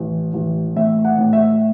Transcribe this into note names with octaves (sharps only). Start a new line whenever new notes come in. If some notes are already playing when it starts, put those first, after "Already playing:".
Already playing: A1
A1
A2 E5
F#5
A2
E5